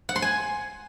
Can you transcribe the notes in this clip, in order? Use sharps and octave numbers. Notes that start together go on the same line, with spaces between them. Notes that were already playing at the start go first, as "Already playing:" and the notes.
F#5
C6
G#5